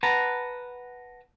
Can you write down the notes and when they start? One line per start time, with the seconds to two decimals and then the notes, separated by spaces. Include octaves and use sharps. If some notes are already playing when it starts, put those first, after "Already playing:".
0.03 B4 F#5 A5 A#5